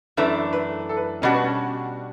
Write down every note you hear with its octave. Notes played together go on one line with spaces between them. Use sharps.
F#2 E3 A3 D4 B4
A4
B4
A4
B4
B2 G3 C#4 D4 F#4
B3
C#4